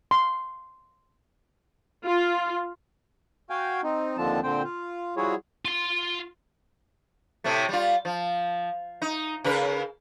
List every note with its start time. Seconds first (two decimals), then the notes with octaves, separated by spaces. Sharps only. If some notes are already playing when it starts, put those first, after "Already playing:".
0.11 C6
2.04 F4
3.50 F#4 F5 G5 G#5
3.83 C4 D#4
4.17 D#2 D3 F3 C4 D4 A5
4.43 A#2 D3 C4 C5 G5
4.64 F4
5.17 F3 G3 E4 F#4 G#4 C#5
5.65 F4 C6
7.44 A2 C3 A3
7.69 G3 F4
8.05 F3
9.02 D#4
9.44 C#3 A#4 B4